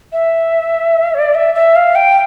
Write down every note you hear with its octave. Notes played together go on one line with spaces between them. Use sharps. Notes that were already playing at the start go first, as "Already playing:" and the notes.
E5
D5
E5
E5
F5
G5